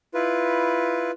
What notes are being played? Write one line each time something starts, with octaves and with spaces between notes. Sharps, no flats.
E4 F4 B4